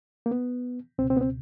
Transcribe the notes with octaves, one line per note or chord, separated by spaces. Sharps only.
A#3
B3
C#2 B2 C4
C4
B3
C4